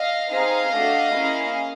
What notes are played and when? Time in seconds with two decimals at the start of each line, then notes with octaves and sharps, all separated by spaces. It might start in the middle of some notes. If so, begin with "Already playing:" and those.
Already playing: D#5 F5
0.30 C4 D#4 G#4 D#5 F5
0.72 A3 D4 F#4
1.13 A#3 C#4 E4 G#4